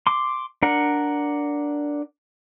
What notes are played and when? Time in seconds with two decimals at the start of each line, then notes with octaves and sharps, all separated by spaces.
0.07 C6 D6
0.63 D4 A#4 F#5